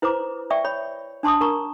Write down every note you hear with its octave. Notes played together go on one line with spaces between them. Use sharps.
E4 B4 C5 A#5 D6
D5 E5 G5 C#6
C#5 B5
D4 A5 C6 D6 D#6
D4 A#4 A#5 C#6